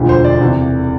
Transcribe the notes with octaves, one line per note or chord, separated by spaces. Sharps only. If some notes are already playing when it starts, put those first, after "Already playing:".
Already playing: E1 D2 D3 F3
C5
D5
E2 C3 E3